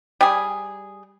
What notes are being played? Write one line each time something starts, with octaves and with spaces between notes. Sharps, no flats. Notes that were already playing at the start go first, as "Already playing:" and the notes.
G3 G#4